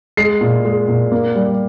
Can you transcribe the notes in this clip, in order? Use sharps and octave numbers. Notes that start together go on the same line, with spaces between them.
G#3 C7
A#2
G#3
A#2
A#3
G3